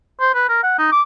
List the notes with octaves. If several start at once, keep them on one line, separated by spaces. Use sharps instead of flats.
C5
B4
A#4
F#5
D#4
D6